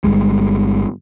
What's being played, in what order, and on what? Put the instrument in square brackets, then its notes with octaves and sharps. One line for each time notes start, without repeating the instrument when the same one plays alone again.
[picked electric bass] G1 F#2 G3 G#3